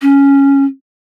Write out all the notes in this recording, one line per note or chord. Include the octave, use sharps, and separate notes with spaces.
C#4